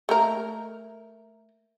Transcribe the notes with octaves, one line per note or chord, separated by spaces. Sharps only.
A3 A#3 A#4